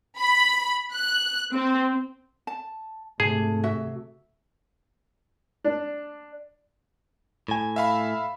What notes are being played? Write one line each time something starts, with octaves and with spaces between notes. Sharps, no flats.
B5
F#6
C4
A5
G#2 C3 A3 G#4 A5
F#4 E5
D4
A2 G#5
E5 F5 B5